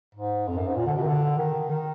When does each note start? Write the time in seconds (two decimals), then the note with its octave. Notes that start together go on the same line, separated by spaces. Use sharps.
0.15 G#2
0.48 F2
0.58 F#2
0.67 G#2
0.76 A#2
0.86 D3
0.96 B2
1.02 D#3
1.07 D3
1.37 D#3
1.69 D#3